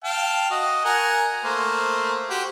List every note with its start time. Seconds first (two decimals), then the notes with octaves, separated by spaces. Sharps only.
0.04 F5 G5 A5
0.51 F#4 D#5
0.85 A#4 F#5 G#5
1.44 A3 A#3 C5
2.30 F#4 G4 C5